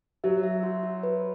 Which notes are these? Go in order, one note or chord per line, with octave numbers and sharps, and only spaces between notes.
F#3 E5
E5
F#4
F#4
B4